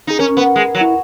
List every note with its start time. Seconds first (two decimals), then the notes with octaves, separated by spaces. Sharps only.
0.07 D#4 G#4
0.19 C#4 A#4
0.37 B3
0.56 G#3
0.75 F#3
0.81 E4